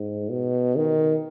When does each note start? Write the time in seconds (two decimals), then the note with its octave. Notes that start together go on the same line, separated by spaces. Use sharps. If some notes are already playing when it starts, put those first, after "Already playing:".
Already playing: G#2
0.30 B2
0.76 D#3